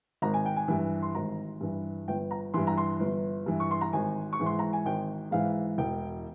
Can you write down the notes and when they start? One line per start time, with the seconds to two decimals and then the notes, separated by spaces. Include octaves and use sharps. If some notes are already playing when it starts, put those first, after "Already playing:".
0.22 G#1 A#5
0.34 G#5
0.45 G5
0.56 G#5
0.68 G2 E3
1.02 C6
1.15 G#1 A#5
1.61 G2 E3
2.08 G1 G5
2.31 A#5
2.54 G2 E3 C6
2.67 A#5
2.77 C6
3.00 G1
3.46 G2 E3
3.60 C#6
3.71 C6
3.81 A#5
3.93 G#1 G#5
4.33 C#6
4.39 G#2 E3
4.46 C6
4.59 A#5
4.73 G#5
4.85 G#1 G5
5.31 G#2 E3 F5
5.78 E1 G5